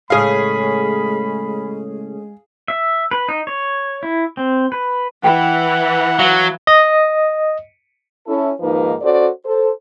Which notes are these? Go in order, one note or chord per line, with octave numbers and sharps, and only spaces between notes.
A2 C#3 G#3 G#4 F5 B5
E5
B4
D#4
C#5
E4
C4
B4
E3 F#5 G5 B5
F#3 F5
D#5
C#4 E4 A4
D#2 G#2 F3 A#3 D#4 B4
C#4 F#4 A4 C5 D5
A4 C5